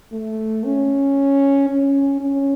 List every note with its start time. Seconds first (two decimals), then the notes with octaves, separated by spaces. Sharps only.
0.12 A3
0.65 C#4
1.69 C#4
2.21 C#4